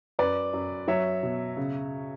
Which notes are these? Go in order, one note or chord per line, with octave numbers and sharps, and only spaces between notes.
F#2 B4 D5
F#2
F#3 C#5 E5
B2
C#3